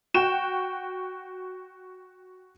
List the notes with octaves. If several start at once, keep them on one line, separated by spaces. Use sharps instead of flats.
F#4 G5 E7